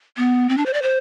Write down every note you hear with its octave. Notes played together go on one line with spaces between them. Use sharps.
B3
C4
D4
C5
D5
C5